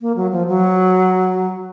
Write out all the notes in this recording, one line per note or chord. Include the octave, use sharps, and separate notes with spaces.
A#3
F#3
F3
F#3